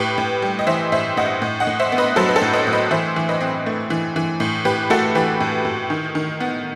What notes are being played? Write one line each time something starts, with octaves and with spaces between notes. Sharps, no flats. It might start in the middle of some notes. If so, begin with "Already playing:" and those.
Already playing: A2 G4 B4
A2
G3
D#5
E3 C5 E5
A2 C5 E5
A2 D#5 F#5
A2
D#5 F#5
A2
C5 E5
B3
B4 D#5
F#3 A4 C5
B4
A4 C5
A2
B4 D#5
A2
B4 D#5
E3 C5 E5
E3
B4 D#5
C4
A3
E3
E3
A2
A2 G4 B4
A3 F#4 A4
E3 G4 B4
A2
A2
D#3
D#3
B3